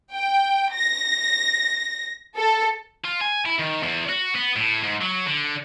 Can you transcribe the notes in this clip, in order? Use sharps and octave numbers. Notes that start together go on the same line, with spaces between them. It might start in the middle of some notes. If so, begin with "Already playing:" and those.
G5
A#6
A4
F4
G#5
E4
D#3
E2
F#4
B3
A2
G#2
F#3
D3